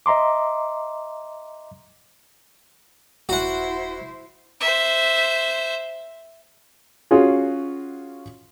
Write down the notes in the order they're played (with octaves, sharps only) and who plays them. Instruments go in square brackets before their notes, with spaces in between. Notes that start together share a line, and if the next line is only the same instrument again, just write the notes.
[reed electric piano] D#5 E5 A#5 C6 D6
[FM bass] D#1 [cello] E4 C5 [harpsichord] F#4 F#5
[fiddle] C5 E5
[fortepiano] C#4 F4 F#4 G#4